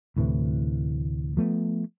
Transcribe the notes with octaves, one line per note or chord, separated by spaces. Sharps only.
D2 A2 C3 E3
F3 A3 B3